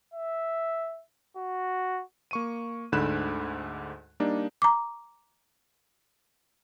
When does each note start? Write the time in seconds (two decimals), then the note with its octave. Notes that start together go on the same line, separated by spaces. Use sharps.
0.14 E5
1.37 F#4
2.31 A#3 C#6 D#7
2.92 D2 G#2 D3 B5 F#6 E7
4.20 G3 A#3 D4 D#4
4.62 A#5 D6